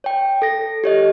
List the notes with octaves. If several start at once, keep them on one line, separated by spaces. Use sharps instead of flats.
C#5 G5
A4 A#6
G4 C#5 D#5